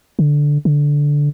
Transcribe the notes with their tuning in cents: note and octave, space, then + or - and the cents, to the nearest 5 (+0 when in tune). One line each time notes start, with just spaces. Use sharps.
D3 -5
D3 -10